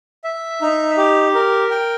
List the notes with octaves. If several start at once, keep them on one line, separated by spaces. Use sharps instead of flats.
E5
D#4
G4
A#4
G5